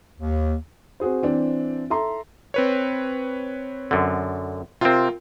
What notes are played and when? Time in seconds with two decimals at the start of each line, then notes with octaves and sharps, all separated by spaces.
0.18 D#2
1.00 C4 F#4 G#4 C5
1.22 E3 C4 D4
1.90 A4 E5 A#5 C6
2.54 C4 B4 C#5
3.91 F#2 D3
4.81 C3 C4 F4 A#4